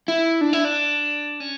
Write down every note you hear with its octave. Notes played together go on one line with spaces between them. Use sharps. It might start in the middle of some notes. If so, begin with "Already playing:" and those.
E4
D4
E4
D4
C#4